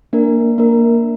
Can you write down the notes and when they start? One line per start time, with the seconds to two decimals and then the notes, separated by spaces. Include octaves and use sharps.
0.13 A#3 D4 A#4
0.58 A#3 D4 A#4